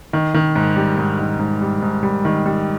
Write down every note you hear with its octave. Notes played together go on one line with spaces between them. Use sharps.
D#3
D#3
G#2
G3
G#2
D#3
G#2
G3
G#2
G3
D#3
G3